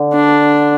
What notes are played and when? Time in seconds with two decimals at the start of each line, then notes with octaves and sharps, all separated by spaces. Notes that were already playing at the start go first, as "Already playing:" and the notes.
Already playing: D3
0.13 D4